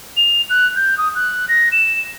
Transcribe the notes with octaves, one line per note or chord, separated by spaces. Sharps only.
F7
F#6
G6
D#6
F#6
A#6
E7